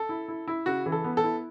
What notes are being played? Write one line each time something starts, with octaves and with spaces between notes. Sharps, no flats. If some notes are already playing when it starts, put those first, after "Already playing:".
Already playing: A4
E4
E4
E4
C#3 F#4
E3
A4
B3
A4
E4